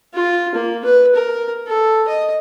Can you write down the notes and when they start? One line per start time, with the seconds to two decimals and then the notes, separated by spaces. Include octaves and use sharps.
0.14 F4
0.55 A#3
0.85 B4
1.15 A#4
1.67 A4
2.08 D#5